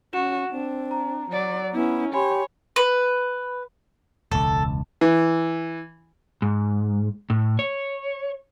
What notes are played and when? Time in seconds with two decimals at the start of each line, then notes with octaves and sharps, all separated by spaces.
0.13 C#4 F#4 E7
0.52 C4 D4
0.91 A#5
1.32 F#3 D5
1.73 B3 C#4 E4
2.13 G4 C#5 G#5 B5 C6
2.76 B4
4.31 E1 C#2 A4
5.01 E3
6.42 G#2
7.30 A2
7.59 C#5